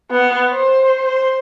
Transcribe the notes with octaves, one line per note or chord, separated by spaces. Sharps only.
B3
C5
C5